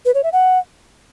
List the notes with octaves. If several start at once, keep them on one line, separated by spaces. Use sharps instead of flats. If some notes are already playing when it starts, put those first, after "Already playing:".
B4
C#5
E5
F#5